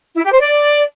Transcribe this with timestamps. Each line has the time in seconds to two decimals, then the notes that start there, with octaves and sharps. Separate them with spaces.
0.15 E4
0.24 G4
0.32 C5
0.41 D5